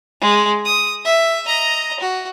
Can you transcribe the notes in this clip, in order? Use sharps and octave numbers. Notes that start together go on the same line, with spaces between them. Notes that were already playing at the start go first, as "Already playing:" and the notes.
G#3
D#6
E5
D#5 A#5
F#4